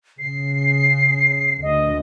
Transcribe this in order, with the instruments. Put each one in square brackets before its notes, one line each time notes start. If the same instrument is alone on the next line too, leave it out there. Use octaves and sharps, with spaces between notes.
[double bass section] C#3 [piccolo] C7
[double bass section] D2 [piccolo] D#5